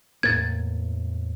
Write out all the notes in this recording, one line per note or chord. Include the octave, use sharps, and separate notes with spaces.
E2 A2 A#3 G#6 A6